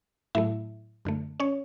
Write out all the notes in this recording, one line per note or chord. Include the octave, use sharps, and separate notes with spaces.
A2 F#3 A3 E4 E5
F#2 D3 A3
C#4 C#5